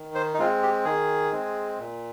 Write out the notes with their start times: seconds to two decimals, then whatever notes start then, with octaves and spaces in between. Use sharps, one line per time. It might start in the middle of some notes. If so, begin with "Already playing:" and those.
Already playing: D#3
0.15 C5
0.34 D#4
0.39 G#3 C4 F4
0.63 G4
0.85 D#3 G#4
1.32 G#3 C4
1.78 A#2